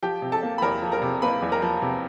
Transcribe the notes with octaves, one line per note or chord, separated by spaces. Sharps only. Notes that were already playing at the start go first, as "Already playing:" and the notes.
F3 G4 G5
C3
A4 A5
A#3
B5
E2 A#4 A#5
F3
A#4 A#5
C3
A#3 B4 B5
E2
A#4 A#5
F3
C3